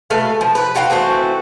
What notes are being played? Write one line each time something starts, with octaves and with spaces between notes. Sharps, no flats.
B2 A3 B4 F5
F3
B4
C4 F#4 F5 G5
E3 A3 C4 F#4